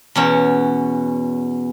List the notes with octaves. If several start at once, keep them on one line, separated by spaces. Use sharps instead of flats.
E2 B2 C#4